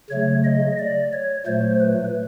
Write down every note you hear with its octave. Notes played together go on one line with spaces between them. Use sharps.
C#3 F#3 A3 C#5
D#5
D5
C#5
A#2 F#3 A3 C5
B4